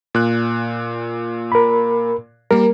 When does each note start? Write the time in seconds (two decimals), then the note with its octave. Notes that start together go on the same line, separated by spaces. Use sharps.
0.14 A#2 F#6
1.52 A#4 B5
2.50 G3 A#3 A#4